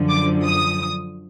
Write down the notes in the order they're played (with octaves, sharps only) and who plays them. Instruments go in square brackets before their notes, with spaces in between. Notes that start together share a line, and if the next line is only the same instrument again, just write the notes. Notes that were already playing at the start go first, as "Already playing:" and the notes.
Already playing: [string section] F#2 D3 F3
D6
D#6